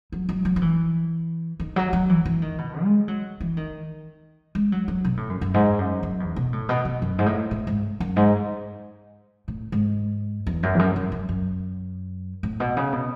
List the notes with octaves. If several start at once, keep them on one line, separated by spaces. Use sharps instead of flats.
F#3
F#3
F#3
F#3
E3
D#3
F#3
F#3
E3
E3
D#3
B2
G#3
F#3
E3
D#3
G#3
F#3
F#3
B2
A2
F#2
F#2
G#2
F#2
F#2
E2
B2
A2
B2
B2
F#2
G#2
A2
A2
G#2
F#2
G#2
A2
G#2
E2
F#2
E2
F#2
F#2
F#2
F#2
A2
B2
C#3
B2